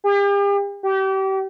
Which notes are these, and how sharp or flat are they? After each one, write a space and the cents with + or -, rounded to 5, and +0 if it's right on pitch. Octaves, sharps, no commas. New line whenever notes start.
G4 +40
G4 -30